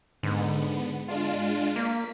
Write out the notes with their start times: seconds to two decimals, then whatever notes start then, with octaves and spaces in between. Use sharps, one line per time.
0.23 G#2 D3 B3
1.08 G#3 D4 F4
1.76 A#3 B6